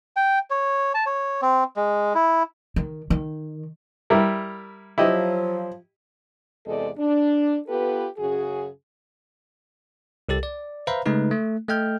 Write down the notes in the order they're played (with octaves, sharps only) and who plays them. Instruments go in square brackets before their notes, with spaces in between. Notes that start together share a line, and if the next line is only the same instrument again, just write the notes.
[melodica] G5
C#5
A5
C#5
C4
G#3
E4
[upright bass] D#3
D#3
[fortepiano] G3 E4 A#4
[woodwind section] F3 F#3 [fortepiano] E4 G4 D#5
[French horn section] E2 C3 G#3 A4 D5 D#5
D4
B3 F4 G4 A4 B4
F#2 C#3 F#4 G#4
[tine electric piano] C2 G4 A4 A6
D5
B4 C5 E5 F5 A#5 B5
C#3 G#3 A3 D#4 B4
A3
A3 A4 D#5 G5 F6 G6